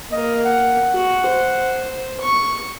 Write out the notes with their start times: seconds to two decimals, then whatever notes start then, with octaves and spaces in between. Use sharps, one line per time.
0.12 A#3 A#4 D#5
0.45 F#5
0.93 F#4
1.26 C5
2.20 C#6